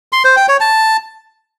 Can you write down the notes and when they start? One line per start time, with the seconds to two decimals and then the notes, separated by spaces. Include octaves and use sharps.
0.12 C6
0.24 C5
0.36 G5
0.48 C#5
0.60 A5